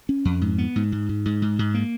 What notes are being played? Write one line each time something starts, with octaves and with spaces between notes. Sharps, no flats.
C#4
F2
G#2
B3
G#2
G#2
G#2
G#2
G#2
G#2
A#3